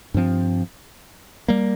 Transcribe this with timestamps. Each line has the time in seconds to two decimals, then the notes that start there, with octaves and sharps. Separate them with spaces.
0.14 G2 F3 C4
1.48 G3 A#3